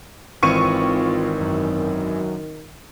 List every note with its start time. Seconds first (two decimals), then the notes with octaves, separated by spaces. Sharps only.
0.43 G#1 D#3 E3 C4 F4 C#6 C#7 D#7
1.41 F#2